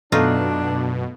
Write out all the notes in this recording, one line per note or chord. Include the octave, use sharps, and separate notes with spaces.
F#2 B2 F#3 A3 B3 D4 D#4 F4